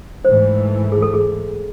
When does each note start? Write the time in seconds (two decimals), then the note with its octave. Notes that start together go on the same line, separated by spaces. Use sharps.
0.25 G#2 E3 A3 C5
0.92 G#4
1.02 A4
1.14 G#4